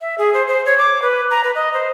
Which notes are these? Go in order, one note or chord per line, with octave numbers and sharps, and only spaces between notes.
E5
G#4
C5
C5
C#5
D6
B4
A#5
B4
D#5
C5